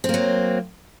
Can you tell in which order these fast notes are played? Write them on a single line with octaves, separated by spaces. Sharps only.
C4 A#3 F#3